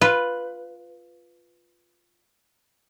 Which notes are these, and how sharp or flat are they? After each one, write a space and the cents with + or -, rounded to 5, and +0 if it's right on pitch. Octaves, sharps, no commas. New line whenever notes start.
F4 +0 B4 +0